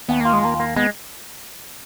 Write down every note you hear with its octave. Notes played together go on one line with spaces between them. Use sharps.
D#2 B3
A#3 F4
G#3
D#2 A#3
A#3
G#3 B3